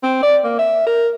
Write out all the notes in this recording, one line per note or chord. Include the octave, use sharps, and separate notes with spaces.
C4
D5
A#3
E5
A#4